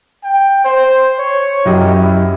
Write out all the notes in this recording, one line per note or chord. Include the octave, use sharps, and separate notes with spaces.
G5
C5
C#5
F#2 E4 G4 D#5
E4